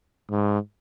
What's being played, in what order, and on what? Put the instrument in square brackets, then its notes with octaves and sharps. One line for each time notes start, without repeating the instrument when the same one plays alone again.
[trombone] G#2